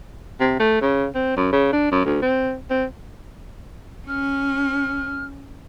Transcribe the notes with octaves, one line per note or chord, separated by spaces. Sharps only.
C3
A3
C#3
C4
F#2
C#3
D4
F#2
D2
C4
C4
C#4 F6